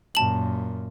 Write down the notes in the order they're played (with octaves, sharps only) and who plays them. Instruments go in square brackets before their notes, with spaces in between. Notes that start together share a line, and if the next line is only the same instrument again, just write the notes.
[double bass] F#2 A#2 [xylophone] A5 F#7